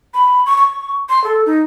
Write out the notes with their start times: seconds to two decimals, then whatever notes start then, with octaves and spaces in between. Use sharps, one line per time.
0.14 B5
0.46 C#6
0.58 C#6
1.09 C6
1.24 A4
1.46 D#4